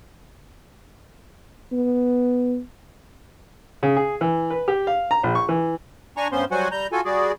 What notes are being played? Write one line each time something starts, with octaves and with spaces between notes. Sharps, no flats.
B3
C#3
G#4
E3
B4
G4
F5
A#5
A#1
C#6
E3
D4 G#5 A#5 C#6
G2 B3 C#4 C5 C6
F#3 G3 F#4 C5 F#5 G#5
G3 A#5 G6
F4 F#4 A4 G#5
G3 F#4 G#4 D5